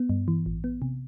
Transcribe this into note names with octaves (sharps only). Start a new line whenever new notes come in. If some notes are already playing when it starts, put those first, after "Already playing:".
Already playing: B3
G2
E3
A1
B3
C3